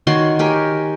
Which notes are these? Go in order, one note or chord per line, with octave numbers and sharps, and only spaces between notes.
D#3 F#4 C#5 C6
G4 A#4 G#5